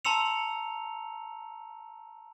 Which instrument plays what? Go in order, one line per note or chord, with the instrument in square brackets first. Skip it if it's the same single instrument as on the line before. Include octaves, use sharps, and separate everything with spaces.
[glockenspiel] A5 A#5 C6 E6 C#7 F7